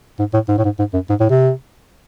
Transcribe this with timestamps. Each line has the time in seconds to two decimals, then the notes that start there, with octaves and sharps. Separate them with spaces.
0.19 G#2
0.34 A2
0.48 G#2
0.58 A2
0.65 G#2
0.79 G#2
0.94 F#2
1.10 G#2
1.20 A2
1.30 C3